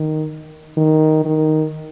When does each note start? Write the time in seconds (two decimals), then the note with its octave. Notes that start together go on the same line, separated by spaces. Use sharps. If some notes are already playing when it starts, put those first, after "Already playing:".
Already playing: D#3
0.77 D#3
1.25 D#3